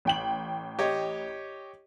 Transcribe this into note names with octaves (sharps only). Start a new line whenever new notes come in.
A1 G5 F#7
G4 C#5 D#5